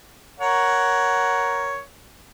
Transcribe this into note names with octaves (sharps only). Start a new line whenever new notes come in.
A#4 C#5 F#5